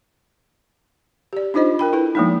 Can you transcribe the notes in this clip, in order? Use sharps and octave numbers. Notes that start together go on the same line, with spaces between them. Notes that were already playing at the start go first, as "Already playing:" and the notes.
G4 D5
D4 D#4 F4 C5 D#5
A#4 G5 B5
E4 A4 B4
F3 G#3 A#3 B3 D#4